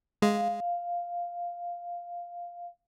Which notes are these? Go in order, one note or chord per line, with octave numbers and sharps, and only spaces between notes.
G#3 F5